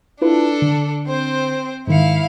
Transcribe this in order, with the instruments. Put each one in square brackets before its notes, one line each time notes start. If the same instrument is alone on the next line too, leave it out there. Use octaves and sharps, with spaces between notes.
[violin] D4 A4 [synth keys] E4 F4 B4
[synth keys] D3
[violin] C4 C5
[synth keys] G#2 D#3 C#7 [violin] E4 F5